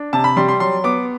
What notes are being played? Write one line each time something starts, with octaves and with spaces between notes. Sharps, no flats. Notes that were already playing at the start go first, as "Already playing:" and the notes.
Already playing: D4
C3 A5
B5
G3 C6
C6
F#3 C6
B3 D6